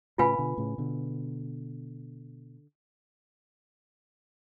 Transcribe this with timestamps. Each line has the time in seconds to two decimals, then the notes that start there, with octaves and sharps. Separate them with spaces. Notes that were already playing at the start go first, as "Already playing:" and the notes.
0.18 A2 C#3 F4 B4 F5 G#5 B5
0.38 B2 D3
0.58 A2 C#3
0.78 B2 D3